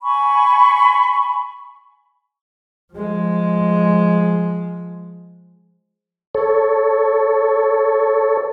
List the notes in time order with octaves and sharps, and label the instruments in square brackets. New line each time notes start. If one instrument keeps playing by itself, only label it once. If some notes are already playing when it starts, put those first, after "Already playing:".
[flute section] G#5 B5 C#6
[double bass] F3 G#3
[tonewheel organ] A4 C#5